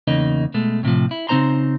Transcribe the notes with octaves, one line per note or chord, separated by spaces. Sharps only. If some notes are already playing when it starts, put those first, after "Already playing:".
E2 C#3 A#3 D#4 D#5
B2 G#3 A3
A2 C3 D#3 F3
E4
C#3 C4 D#4 C5 A#5 C6